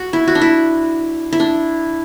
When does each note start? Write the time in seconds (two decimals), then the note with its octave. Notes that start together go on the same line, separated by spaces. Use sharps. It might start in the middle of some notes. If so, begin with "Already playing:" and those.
Already playing: F#4
0.13 E4
0.28 F#4
0.35 D4
0.41 E4
1.33 E4
1.40 D4